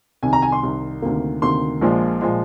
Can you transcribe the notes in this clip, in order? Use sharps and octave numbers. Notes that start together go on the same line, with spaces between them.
C2 C3 D#3 G#5
A#5
G#5
C6
C2 C3 D#3
D2 C3 D#3 A#3
D2 C3 D#3 A#3 C6
A#1 A#2 F3 G#3
A#2 F3 G#3